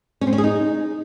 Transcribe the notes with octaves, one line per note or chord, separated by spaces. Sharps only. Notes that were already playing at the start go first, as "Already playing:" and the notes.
C#4
C4
C#4
G#4
D#4